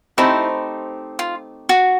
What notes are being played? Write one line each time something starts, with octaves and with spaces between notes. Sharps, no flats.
A3 C4 D#4 E4 G4 C5
F4
F#4